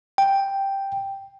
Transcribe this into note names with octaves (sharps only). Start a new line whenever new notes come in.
G5